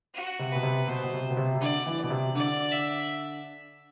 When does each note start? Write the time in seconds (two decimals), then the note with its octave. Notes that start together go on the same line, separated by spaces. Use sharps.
0.14 F#4
0.39 C3
0.52 B2 B4
0.63 C3
0.88 B2 C5
1.04 B2
1.12 C3
1.31 B2
1.37 C3
1.55 C3
1.61 D3 D5
1.86 E3
2.03 B2
2.10 C3
2.35 D3 D5
2.72 E5